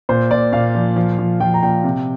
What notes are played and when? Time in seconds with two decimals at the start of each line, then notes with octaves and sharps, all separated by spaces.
0.09 A#2 C5
0.31 A#2 D5
0.53 A#2 F5
0.75 F3
0.96 F3
1.19 F3
1.40 F3 G5
1.54 A#5
1.62 A#2 G5
1.84 C3